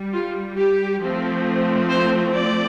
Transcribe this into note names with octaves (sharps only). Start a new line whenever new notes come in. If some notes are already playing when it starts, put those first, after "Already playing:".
Already playing: G3
F4
G4
F3 A3 C4
C5
D5